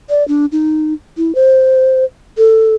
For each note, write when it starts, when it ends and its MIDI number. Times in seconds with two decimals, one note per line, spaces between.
0.10 0.26 74
0.28 0.46 62
0.52 0.94 63
1.17 1.35 64
1.35 2.04 72
2.38 2.75 69